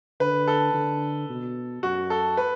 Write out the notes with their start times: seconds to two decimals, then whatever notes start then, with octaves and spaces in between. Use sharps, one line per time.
0.20 D3 B4
0.48 A4
0.74 D3
1.29 B2
1.83 F#2 F#4
2.10 A4
2.37 B4